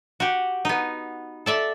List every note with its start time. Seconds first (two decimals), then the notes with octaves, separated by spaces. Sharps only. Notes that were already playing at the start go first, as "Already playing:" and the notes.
0.20 F#4 G4
0.65 B3 D#4
1.46 A4 D5 E5